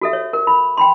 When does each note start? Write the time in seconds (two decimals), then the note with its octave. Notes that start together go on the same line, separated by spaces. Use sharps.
0.01 F#4 A4 E5
0.13 C#5
0.33 A#4
0.47 B5
0.77 G5 B5 C6